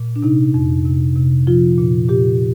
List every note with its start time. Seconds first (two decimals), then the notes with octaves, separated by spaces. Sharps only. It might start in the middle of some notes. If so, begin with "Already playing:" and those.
Already playing: A#2
0.16 D4
0.23 C3 D#4
0.54 F2
0.85 C3
1.16 C3
1.47 F3 F4
1.78 A#2
2.09 A#2 G4